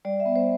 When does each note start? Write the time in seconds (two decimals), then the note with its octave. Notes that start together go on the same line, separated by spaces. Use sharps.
0.05 G3 D5
0.20 E5
0.26 B3
0.36 C5